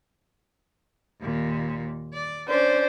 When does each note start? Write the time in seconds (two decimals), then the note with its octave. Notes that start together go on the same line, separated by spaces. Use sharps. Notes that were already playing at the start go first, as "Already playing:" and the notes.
1.20 D#2 A#2
2.13 D5
2.48 C#4 D4 C5 D5